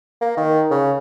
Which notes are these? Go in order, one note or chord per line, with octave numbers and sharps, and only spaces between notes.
A#3
D#3
C#3